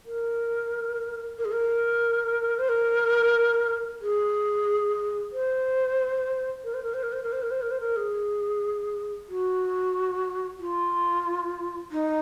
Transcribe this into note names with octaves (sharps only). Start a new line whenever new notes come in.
A#4
A#4
G#4
A#4
C5
A#4
G#4
C5
A#4
C5
A#4
C5
A#4
C5
A#4
C5
A#4
C5
A#4
C5
A#4
G#4
F#4
F4
D#4